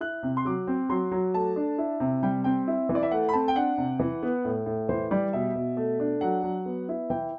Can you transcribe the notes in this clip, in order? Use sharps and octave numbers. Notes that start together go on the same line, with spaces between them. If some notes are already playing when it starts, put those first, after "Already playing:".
E4 F#6
C3
C6
F#3 D6
C4
F#3 C6
F#3
A3 A5
D4
E4
C3
G3 G5
C4 G5
E4
E3
D5
E5
A3 F#5
B5
C4 A5
G5
D4 F#5
C3
E3
B3
A2
A2
E3 C5
G3 D5
B2 E5
B2
A3
D4
F#3 F#5
F#3
B3
E4
E3 G5